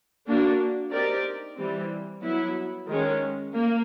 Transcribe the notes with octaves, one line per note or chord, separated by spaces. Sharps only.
A#3 D4 F#4
C4 D#4 G4 A#4 D5
E3 G3 C4
F#3 B3 E4
D#3 G#3 C#4
A#3